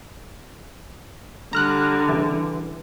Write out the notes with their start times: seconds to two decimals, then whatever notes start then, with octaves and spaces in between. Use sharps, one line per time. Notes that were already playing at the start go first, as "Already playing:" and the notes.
1.53 D3 G3 A#5 F6 F#6
2.09 C#3 E3